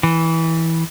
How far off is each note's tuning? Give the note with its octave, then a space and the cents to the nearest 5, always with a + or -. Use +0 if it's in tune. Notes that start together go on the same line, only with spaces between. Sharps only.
E3 -15